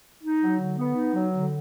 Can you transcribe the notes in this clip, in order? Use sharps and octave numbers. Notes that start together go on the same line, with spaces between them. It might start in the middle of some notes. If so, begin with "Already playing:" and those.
D#4
F#3
D3
B3
D#4
F#3
D3